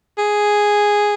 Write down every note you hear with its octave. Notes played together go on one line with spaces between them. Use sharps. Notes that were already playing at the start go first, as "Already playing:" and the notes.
G#4